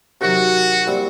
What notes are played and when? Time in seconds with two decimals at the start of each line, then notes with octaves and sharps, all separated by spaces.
0.21 C3 D#3 F#3 F#4
0.87 A#2 G3 C4 E4